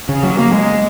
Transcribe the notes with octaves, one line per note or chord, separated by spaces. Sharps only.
C#3
F#3
A#3
G#3